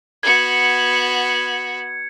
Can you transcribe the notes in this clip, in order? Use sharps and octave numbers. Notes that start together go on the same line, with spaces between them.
B3 F#4 G#6 C#7